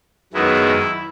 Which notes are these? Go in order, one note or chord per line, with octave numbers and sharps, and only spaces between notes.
F#2 D#3 G#3 B3 E4